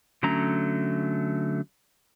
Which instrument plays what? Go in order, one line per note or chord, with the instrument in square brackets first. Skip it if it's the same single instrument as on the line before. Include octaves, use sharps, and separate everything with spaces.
[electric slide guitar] D3 F#3 A3 C#4 A#5